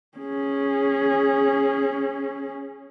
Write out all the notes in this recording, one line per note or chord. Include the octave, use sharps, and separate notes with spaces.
C#4 G#4